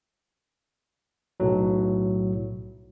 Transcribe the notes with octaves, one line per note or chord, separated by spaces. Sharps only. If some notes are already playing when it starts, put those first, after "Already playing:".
B1 A2 F#3